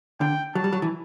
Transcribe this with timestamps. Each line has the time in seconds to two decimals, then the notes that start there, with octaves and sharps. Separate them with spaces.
0.21 D3 G5
0.55 F#3 A5
0.64 G3
0.73 F#3
0.82 E3